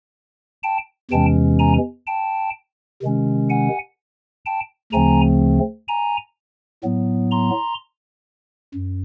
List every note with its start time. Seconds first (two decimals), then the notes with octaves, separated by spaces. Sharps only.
0.63 G5 A5
1.11 E2 C3 E3 G#3 C#4 G5 A5
1.59 G#5 A#5
2.07 G5 A5
3.02 C3 D#3 G#3 C#4
3.50 F#5 G#5
4.46 G5 A5
4.93 D2 C#3 F3 A3 C4 G#5 A#5
5.88 G#5 A#5
6.84 A2 F#3 B3
7.31 A#5 C6
8.74 F#2